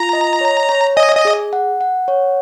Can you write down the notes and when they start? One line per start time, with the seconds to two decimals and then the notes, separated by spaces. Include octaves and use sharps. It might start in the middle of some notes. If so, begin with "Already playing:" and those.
Already playing: F4 A#5
0.13 D#5
0.41 C#5
0.69 C#5
0.96 D#5 G#5
1.15 D#5
1.25 G#4
1.53 F#5
1.81 F#5
2.08 C#5